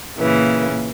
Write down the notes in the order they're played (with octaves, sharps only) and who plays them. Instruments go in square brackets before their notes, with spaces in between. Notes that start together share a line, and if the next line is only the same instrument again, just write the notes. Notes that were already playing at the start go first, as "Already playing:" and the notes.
[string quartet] A#2 C#3 E3